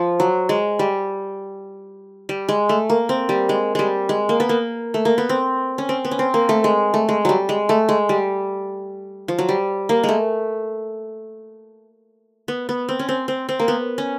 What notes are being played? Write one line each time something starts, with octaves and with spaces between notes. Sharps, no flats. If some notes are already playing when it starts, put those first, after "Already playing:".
Already playing: F3
F#3
G#3
G3
G3
G#3
A3
A#3
C4
G3
G#3
G3 G#3
G#3
A#3
B3
A#3
A3
A#3
B3
C4
C#4
C4
B3
C#4
C4
A#3
A3
G#3
A3
G#3
F#3 G3
G#3
A3
G#3
G3
F3
F#3
G3
A#3
G#3
A3
B3
B3
C4
C#4
C4
C4
C4
A#3
B3
C#4